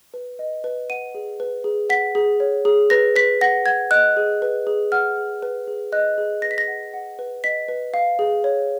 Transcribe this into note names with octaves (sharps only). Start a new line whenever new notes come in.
B4
D#5
B4
F#5 D#7
G#4
B4
G#4
F#5 B6
G#4
C#5
G#4
B4 A#6
B4 B6
F#5 A#6
F#5 G#6
D#5 F#6
G#4
B4
G#4
F#5 F6
G#4
B4
G#4
D#5 F#6
G#4
B4 A#6
B6
A#6
F#5
F#5
B4
D#5 B6
B4
F5
G#4
C#5